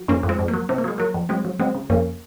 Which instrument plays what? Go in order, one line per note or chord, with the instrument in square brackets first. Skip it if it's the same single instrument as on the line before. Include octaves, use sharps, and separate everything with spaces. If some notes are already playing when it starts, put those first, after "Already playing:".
Already playing: [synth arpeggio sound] F#3
F2 A#3 C#4
F2
G#3 C4
F2
A#3
F#3
C3 C4
A#3
F#3 G#3
F#3 A#3
F2
F#3 G#3 C4
F#3
F#3 G#3 C4
C#3
F2 A#3 C#4